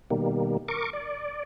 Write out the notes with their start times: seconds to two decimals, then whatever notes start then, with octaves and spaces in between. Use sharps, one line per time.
0.10 B2 D#3 G3 A#3
0.68 A#4 C#6 D6
0.93 D5